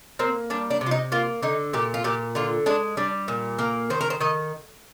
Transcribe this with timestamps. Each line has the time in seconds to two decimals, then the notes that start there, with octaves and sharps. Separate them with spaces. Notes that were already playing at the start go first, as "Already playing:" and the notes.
0.19 A#3 C4
0.50 G3 D4
0.70 D4
0.81 C3
0.86 F4
0.91 D#4
1.12 A#3 F4
1.43 D3 D#4
1.73 A#2 G4
1.94 F4
2.04 A#2 G4
2.35 D3 F4
2.66 G#3 D4
2.97 G3 D4
3.28 A#2
3.59 A#3 A#4
3.90 D#3 C5
4.01 A#4
4.10 C5
4.20 D#3 D#5